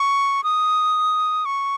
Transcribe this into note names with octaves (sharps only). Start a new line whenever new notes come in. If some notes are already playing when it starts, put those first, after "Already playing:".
Already playing: C#6
D#6
C#6